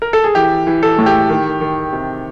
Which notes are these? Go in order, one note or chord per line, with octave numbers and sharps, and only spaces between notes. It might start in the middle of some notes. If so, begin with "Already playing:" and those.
A#4
A4
G#4
E3 G4
E3
A4
A2
G4
D#3
D#3
C3